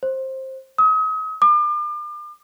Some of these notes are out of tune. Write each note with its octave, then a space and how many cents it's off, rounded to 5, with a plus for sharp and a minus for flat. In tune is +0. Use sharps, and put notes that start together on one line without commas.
C5 +15
D#6 +35
D6 +40